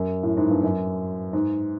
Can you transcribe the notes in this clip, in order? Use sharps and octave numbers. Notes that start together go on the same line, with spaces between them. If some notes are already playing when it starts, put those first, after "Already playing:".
Already playing: F#2
A2
G#2
G2
F#2
G#2